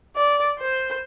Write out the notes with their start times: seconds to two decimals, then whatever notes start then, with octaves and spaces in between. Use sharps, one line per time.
0.16 D5
0.59 C5